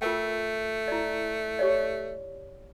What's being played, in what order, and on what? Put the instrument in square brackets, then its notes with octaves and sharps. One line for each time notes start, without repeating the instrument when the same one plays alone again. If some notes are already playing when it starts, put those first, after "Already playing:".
[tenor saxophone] A3 [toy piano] F4 A#4 G5
[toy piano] E4 D5
G4 C#5 D5